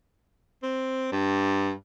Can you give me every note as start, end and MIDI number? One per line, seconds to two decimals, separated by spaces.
0.63 1.09 60
1.12 1.72 43